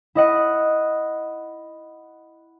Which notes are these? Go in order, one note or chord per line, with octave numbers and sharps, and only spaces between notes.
E4 D#5 F#5